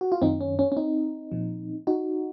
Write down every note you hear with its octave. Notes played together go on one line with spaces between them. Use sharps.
F#4
F4
F#2 D#3 C4 D#4
C#4
C#4
C#4
C4 D#4
A#2 F3
D#4 F#4